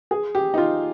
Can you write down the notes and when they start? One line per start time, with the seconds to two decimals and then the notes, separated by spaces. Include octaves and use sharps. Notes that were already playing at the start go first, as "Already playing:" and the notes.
0.11 G#4
0.35 G4
0.54 D#4
0.58 F4